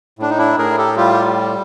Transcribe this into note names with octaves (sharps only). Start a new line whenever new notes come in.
A2 D4
D#4
D4 E4
A2 G#4 A#4
G4 A4
G3 F4 G4
G4